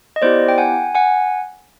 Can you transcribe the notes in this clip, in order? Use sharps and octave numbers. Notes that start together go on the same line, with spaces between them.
D#5
B3 E4 G4 C5 D5
G5
F#5 G#5
F#5 G#5